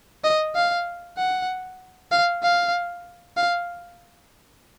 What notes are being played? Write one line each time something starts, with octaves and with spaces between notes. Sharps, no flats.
D#5
F5
F#5
F5
F5
F5